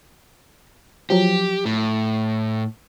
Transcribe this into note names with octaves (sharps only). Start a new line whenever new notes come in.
F3 F#3 G4
A2